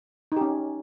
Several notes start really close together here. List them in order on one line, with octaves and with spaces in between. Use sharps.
D#4 G4 C#4